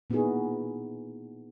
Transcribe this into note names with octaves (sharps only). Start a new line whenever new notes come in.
A#2 B3 D#4 E4 F#4 G#4